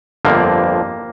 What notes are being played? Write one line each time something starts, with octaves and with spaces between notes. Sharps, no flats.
G1 F2 D3 F3 A#3